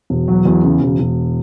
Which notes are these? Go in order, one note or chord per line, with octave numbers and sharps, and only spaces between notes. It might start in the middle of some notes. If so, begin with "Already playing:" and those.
E1
F#3
E2
C#3
E1
E1